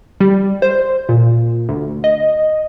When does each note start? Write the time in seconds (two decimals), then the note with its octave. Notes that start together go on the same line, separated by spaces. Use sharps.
0.20 G3
0.62 C5
1.09 A#2
1.69 D2
2.04 D#5